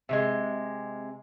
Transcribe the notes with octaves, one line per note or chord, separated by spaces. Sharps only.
C3 F3 G#3